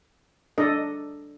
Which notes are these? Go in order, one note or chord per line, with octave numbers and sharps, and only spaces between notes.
D4 A4 D#5